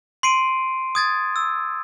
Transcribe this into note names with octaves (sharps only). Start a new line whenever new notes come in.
C6 C7 D7 D#7
D#6 G#6 A6
E6